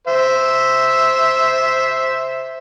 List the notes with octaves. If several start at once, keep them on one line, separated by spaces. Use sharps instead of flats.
C5 E5